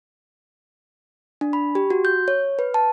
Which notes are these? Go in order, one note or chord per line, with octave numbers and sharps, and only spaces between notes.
D4
B5
G4
F#4
G6
C#5
B4
A5